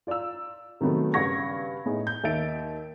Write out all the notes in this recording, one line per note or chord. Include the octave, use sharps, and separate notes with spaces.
F4 D5 F5 A#5 E6
C3 D#3 F#3 A3 B3
G2 C#3 F#5 C#6 G#6 A#6
A2 B3 D#4 G#4
G6
D#2 D#4 E5 A6 D7